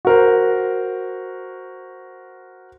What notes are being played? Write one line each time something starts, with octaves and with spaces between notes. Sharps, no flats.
F#4 A#4 C5